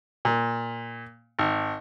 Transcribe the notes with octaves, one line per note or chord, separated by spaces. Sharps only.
A#2
G#1